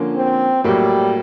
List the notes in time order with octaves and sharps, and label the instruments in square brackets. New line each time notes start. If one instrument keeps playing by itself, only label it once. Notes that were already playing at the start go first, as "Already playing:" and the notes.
Already playing: [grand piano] D3 F3 A#3 C#4
[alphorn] C4
[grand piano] A2 F#3 A#3 [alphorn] G3